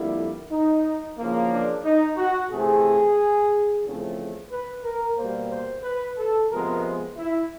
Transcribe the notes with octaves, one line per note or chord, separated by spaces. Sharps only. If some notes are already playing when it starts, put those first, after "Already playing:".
Already playing: F2 D3 G3 A#3 E4
D#4
E2 C#3 F3 A#3
D4
D#4
F#4
C3 E3 A3 C4 G#4
E2 C#3 F3 A3 C4
B4
A#4
B2 G3 A#3 C5
C5
B4
A4
C3 F3 G#3 B3 A#4
E4